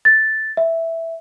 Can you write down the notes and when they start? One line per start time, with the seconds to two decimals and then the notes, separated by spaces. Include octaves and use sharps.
0.05 A6
0.57 E5